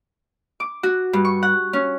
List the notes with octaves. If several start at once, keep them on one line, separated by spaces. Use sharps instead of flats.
D6
F#4
G2
C#6
F#5
C#4